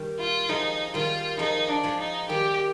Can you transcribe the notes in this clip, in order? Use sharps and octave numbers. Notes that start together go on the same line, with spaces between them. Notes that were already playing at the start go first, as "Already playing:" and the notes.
Already playing: D#3 G3
F4
F3 G#3 D#4
D#3 G3 F4
F3 G#3 D#4
D4
F3 G#3
D#4
D#3 G3 G4